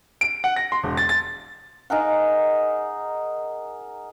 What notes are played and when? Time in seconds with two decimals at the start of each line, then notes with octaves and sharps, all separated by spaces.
0.21 D7
0.44 F#5
0.56 A#6
0.72 C6
0.84 E1
0.97 A6
1.09 A6
1.90 D#4 G#4 A#4 F#5